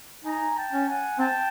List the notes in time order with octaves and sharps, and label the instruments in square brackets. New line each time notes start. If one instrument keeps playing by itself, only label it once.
[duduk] D#4 [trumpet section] G#5 A#5
[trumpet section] G5 A5
[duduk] C#4
[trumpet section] F#5 G#5
[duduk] C4 [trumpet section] G5 A5